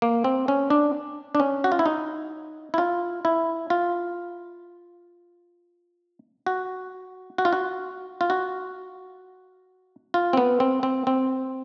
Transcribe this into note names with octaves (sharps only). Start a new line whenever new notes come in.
A#3
C4
C#4
D4
D4
C#4
F#4
F4
E4
D#4
E4
F4
E4
F4
F#4
F#4
F4
F#4
F4
F#4
F4
C4
B3
C4
C4
C4